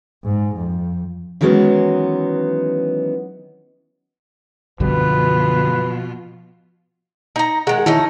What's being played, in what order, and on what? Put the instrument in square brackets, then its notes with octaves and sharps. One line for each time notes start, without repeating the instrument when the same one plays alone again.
[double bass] G#2
F2
[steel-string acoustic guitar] D#3 E3 F#3 G#3 B3 C#4
[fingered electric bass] F#2 D3 G3 [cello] B2 F4 [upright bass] F3 B3 [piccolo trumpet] B4
[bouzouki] D#4 A#5
[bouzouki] D#3 G#3 [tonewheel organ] G#4 F#5
[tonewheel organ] D#3 E4 [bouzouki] A3 C#4 D#4